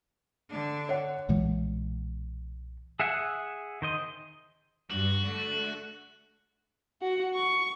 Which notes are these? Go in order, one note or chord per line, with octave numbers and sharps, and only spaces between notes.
D3 D4
C#5 F#5
B1 A#2 E3 G#3
G#4 E5 F#5 G#5
D#3 C5 D#5
G2 F#4
D3 A3
F#4 F#5
C#6